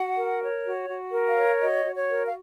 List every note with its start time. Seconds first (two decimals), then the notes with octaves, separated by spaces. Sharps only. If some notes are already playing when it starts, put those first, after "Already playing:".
Already playing: F#4 F#5
0.18 A#4
0.42 C#5
0.65 F#4
0.89 F#4
1.13 A#4
1.26 F5
1.37 C#5
1.61 F#4 D#5
1.85 F#4
1.97 C#5
2.09 A#4
2.26 F5